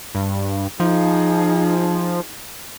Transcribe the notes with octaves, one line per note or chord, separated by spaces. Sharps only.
G2
F3 D#4 G#4